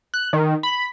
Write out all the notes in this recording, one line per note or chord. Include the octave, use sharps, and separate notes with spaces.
F#6
D#3
B5